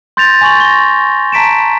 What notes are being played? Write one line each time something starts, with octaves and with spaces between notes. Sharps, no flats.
C6 G6 A6 A#6 F7
G#5 C#6 F#7
A#6 G7
A5 A#5 B6 D7 E7